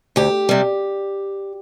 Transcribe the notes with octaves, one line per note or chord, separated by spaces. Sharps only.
D2 G4
C3 G3